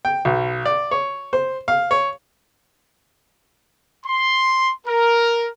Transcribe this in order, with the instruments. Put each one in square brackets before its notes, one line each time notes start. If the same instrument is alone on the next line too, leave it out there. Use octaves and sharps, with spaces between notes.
[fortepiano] G5
B1
D5
C#5
C5
F5
C#5
[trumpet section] C6
A#4